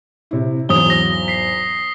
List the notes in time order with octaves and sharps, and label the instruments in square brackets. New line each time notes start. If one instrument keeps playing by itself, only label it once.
[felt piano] C3 E4
[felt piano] G#1 E2 F#3 [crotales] D#6 G7
[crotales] D#6 A#6
B6 C7